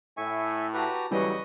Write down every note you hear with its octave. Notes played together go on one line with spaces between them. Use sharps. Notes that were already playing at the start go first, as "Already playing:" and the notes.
A2 E5 G#5 C#6
F#4 G4 B4 A5 A#5
A2 C#3 E3 F#3 G3 B4 D#5 C#6